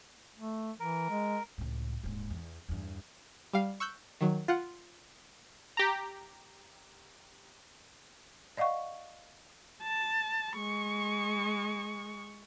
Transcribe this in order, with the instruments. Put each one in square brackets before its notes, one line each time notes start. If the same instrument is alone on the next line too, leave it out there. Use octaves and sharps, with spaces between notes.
[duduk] A3
[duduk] E3 [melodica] A#4
[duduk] G#3
[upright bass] C#2 A2
D#1 G#2
E2
E2 G2
[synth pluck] G3 F5
C#6 E6 F#6 G6
D#3 F#3
F4 F#5
[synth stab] G4 A#5
[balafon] D5 D#5 F5 F#5 C#6
[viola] A5
G#3 C#6